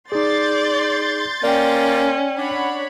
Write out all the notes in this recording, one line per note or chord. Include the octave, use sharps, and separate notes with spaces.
D#4 G#4 D5 C6 G6 A6
A#3 C#4 D5 G5
D4 C#5 F#5 B5